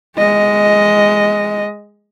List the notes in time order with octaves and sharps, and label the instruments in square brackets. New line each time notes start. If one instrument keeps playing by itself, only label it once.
[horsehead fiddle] G#3 D#5